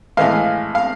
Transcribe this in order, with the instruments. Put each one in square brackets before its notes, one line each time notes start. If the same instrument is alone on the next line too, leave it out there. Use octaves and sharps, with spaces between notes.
[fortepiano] A2 E3 G#3 F5
F5